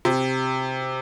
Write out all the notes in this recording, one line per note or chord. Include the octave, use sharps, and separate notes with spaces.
C3